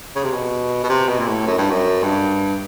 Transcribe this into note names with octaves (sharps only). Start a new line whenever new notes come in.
C#3
C3
B2
B2
C3
B2
A#2
A2
F#2
G2
F#2
G2